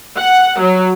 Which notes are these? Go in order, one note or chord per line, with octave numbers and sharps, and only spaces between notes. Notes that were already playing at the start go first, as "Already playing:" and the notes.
F#5
F#3